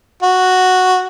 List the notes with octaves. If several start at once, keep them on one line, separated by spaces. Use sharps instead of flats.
F#4